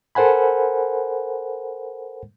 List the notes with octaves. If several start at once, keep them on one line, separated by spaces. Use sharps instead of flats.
A4 A#4 C5 F#5 G#5 B5